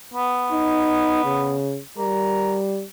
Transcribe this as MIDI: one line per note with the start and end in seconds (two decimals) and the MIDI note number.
0.14 1.60 59
0.52 1.21 63
1.25 1.80 49
1.98 2.85 55
1.98 2.57 70